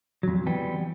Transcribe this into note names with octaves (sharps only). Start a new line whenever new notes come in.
F2 F#3
E3 G3 B3 G5